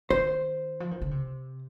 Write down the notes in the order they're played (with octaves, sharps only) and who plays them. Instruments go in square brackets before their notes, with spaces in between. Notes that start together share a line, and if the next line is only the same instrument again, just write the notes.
[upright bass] D#3 [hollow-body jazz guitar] C5
[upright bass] F3
D#3
D3
C3